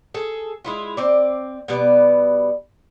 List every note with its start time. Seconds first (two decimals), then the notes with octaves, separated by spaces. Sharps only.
0.14 G#4 A4
0.64 G#3 E4 F4
0.97 C4 D5
1.68 B2 G3 B3 D5